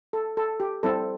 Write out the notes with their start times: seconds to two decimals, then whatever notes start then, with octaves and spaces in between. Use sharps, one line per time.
0.13 A4
0.37 A4
0.60 G4
0.83 G3 C4 E4 A4